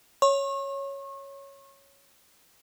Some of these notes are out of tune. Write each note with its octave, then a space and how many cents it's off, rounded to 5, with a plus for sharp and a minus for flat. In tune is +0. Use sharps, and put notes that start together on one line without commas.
C#5 +0 C#6 -35